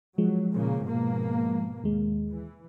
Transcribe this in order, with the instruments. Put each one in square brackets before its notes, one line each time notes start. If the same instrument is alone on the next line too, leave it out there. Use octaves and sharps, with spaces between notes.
[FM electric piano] F3 G#3 [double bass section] F#3
[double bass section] A#2 C#3 A#3
G#2 B2 A#3
[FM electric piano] D#2 G#3
[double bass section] E3